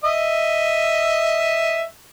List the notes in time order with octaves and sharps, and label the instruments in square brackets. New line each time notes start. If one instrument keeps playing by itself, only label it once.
[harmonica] D#5 E5